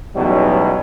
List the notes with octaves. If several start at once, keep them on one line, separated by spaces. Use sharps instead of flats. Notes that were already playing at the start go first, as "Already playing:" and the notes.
A1 E2 B2 F#3 G3 D#4